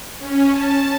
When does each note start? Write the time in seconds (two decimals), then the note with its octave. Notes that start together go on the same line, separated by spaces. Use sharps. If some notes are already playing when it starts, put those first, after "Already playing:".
0.19 C#4
0.51 A5